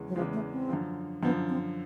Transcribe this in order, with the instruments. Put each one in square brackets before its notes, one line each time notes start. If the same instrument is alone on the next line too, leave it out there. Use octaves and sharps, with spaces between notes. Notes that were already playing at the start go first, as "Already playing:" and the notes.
Already playing: [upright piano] E2 C#3 E3 G#3
[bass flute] F#3
[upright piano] E2 C#3 E3 G#3 [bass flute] F3
[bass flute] A3
C4
[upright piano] F#2 D3 F3
[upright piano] F#2 D3 F3 [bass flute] B3
[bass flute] C4